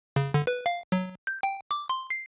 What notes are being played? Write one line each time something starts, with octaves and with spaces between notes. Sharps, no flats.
C#3
D3
B4
F5
F#3
G6
G5
D6
C6
C7